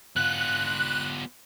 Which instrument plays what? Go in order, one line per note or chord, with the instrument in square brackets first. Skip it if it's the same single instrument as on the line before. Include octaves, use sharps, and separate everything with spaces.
[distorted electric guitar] B3 F4 [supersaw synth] F#6